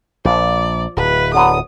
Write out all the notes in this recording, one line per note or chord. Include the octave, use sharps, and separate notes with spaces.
A#1 F3 D5
D1 B4
D3 F#3 B3 D#6